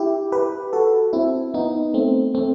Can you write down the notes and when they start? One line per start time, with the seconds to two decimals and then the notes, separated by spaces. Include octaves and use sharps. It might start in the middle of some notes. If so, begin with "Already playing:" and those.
Already playing: E4 G4
0.32 G4 B4
0.73 F#4 A4
1.13 C4 E4
1.54 B3 D#4
1.94 A3 C4
2.35 A3 C4